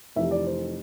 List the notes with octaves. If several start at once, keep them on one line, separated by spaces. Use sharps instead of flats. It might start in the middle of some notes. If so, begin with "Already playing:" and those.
F1 F2 C3 E3 E5
D5
C5